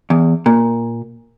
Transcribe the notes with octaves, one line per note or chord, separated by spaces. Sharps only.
E2
A#2